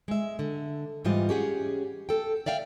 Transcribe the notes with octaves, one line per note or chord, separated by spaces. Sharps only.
G#3 E5
D3
G#2 E3 G3 F4 D#5
C#4 G4 G#4 F#5
A4 G5
D5 E5 F5 G5